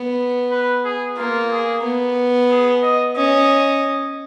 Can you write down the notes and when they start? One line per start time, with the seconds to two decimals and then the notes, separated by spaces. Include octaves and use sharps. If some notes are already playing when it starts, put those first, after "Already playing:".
Already playing: B3
0.51 B4
0.85 G#4
1.17 A#3 F4
1.51 G#4
1.83 B3
2.50 G#4
2.83 D#5
3.16 C#4 D#5